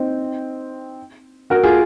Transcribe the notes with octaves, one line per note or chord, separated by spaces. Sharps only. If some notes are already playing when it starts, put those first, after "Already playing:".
Already playing: C4 D#4
F#4 A#4
F4 G#4